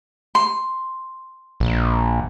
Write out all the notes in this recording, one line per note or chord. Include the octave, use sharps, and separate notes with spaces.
C6
A#1